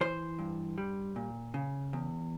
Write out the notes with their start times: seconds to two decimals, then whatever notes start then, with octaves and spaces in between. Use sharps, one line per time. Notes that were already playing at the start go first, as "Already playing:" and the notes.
0.01 E3 C5
0.39 G2
0.78 G3
1.16 A#2
1.54 C#3
1.93 E2